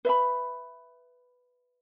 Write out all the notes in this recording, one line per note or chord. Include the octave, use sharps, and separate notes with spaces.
B4 E5 B5